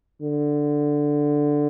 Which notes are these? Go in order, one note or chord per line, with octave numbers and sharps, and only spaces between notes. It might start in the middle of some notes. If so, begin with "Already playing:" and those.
D3